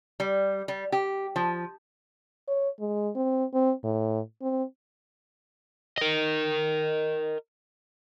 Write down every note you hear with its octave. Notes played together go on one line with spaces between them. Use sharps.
G3
G3
G4
F3
C#5
G#3
C4
C4
A2
C4
A#4 D#5